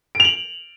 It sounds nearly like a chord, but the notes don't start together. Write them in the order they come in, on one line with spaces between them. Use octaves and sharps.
D7 F7 F#7